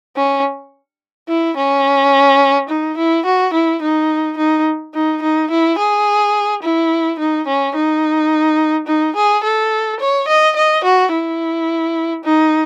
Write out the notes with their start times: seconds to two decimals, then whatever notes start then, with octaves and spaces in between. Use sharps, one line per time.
0.16 C#4
1.28 E4
1.57 C#4
2.69 D#4
2.97 E4
3.25 F#4
3.54 E4
3.82 D#4
4.38 D#4
4.94 D#4
5.22 D#4
5.50 E4
5.78 G#4
6.63 E4
7.19 D#4
7.47 C#4
7.75 D#4
8.88 D#4
9.16 G#4
9.44 A4
10.00 C#5
10.28 D#5
10.56 D#5
10.84 F#4
11.12 E4
12.24 D#4